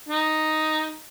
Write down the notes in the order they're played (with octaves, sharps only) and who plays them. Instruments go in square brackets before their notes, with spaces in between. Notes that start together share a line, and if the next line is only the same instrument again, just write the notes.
[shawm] D#4